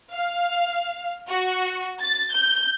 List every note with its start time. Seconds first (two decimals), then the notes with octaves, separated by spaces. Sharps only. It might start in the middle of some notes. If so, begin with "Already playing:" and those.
0.12 F5
1.28 F#4
2.01 A6
2.33 G6